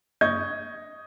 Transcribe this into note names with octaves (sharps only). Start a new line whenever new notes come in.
D#5 C#6 G6 G#6